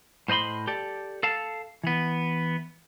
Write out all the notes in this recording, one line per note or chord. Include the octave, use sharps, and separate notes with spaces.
A2 C5 D#5 B5 C6
G4 A4 D5
A4 F5 A5
E3 B3